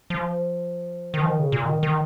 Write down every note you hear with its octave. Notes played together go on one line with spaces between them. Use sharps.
F3
D#3
F3
D#3
C#3
A#2
D#3
D#3